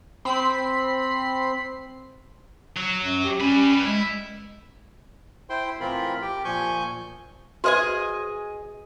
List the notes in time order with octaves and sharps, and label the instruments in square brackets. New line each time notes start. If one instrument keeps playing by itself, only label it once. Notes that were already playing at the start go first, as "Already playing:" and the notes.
[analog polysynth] C4 B5 C7
[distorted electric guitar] F#3
[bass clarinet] F#2
G4
[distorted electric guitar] G3 B4 [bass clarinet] C#4
[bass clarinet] G#3 [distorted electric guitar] E4
[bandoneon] E4 C5 G5 C6
A2 E3 C4 F4 A#4 B5
G4 G5
A#2 F3 G#5 C#6 G6
[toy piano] F#4 B4 C5 [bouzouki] G#4 D#5 G#5